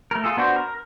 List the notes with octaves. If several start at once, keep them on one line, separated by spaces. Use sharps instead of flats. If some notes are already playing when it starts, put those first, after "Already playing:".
A3 A#4
F4 G#4 A4
B3 D4 F#4 C5
A#4